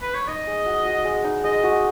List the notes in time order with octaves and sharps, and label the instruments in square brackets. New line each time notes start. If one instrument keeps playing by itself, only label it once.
[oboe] B4
C#5
[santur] D#4 [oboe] D#5
[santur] G#3
F#4
F#4
G#3
D#4
[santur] G#3 [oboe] D#5
[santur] F#4